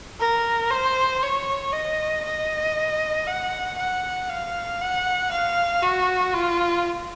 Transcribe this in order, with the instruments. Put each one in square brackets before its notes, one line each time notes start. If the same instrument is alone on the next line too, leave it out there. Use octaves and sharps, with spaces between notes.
[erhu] A#4
C5
C#5
D#5
D#5
F#5
F#5
F5
F#5
F5
F#4
F4